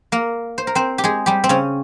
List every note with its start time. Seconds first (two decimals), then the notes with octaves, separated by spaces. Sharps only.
0.12 A#3 A#4
0.58 C5
0.67 A#4
0.75 C4 C5
0.98 G4
1.04 G#3 G#4
1.26 G3 G4
1.44 C4
1.49 C#3 C#4